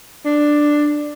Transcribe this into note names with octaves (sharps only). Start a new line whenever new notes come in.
D4